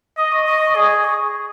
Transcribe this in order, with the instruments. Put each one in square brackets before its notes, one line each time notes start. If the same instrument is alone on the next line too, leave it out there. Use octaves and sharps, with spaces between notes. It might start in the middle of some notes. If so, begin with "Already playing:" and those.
[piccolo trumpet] D#5 [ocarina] D#6
[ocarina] C#6
[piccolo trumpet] D#5 [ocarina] C#6
[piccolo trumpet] G#4 [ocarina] D#6
[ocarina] C#6